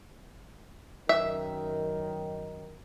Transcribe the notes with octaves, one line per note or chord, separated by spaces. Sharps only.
F#2 D#3 E5